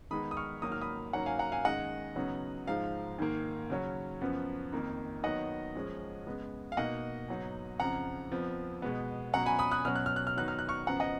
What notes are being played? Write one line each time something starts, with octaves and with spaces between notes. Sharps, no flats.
D#3 G#3 B3 D#4 B5 D#6
D#6
C#6 F6
G#2 D#3 F#3 A#3 D#4 D#6
F6
B5 D#6
G#2 F#3 A#3 C#4 F#5 A#5
F5 G#5
F#5 A#5
F5 G#5
F#2 D#3 G#3 D#5 F#5
C#3 F#3 B3 D#4
G#2 F3 G#3 F5
G#2 D#3 A#3
C#3 F#3 C#4
F#2 F3 B3
F2 D#3 A#3 D#4
D#3 F#3 B3 D#5 F#5
F#2 F3 G#3 C#4
C#3 G#3 B3
F5
B2 A#3 D#4 D#5 F#5
G#2 F#3 B3 D#4
F2 C#3 F3 F#5 A#5
F2 F3 B3
B2 G#3 B3
B2 F#3 C#4 F#5 A#5
G#5 B5
B5 D#6
D#6 F#6
B2 F#3 C#4 F6
F#6
F6
F#6
F6
D#3 F#3 B3 D#4 F#6
F6
F#6
C#6 F6
F#2 C#3 F3 B3 F#5 A#5
D#5 F#5